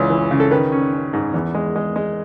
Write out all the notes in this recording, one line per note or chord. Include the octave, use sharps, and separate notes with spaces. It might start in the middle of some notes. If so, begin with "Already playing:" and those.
Already playing: C#2 E3
E3
C#3
A4
D#3 B4
C#4
C#4
G#2
E2
G#3
G#3
G#3